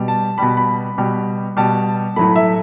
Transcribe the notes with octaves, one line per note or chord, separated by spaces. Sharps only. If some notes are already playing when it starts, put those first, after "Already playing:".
Already playing: B2 G3
A5
B2 G3 B5
B5
B2 G3
B2 G3 A5
A2 F#3 A3 B5
E5